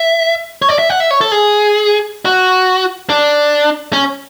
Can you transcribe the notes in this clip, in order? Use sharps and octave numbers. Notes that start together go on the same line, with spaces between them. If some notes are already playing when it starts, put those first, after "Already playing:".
Already playing: E5
C#5
D5
E5
F#5
E5
C#5
A4
G#4
F#4
D4
C#4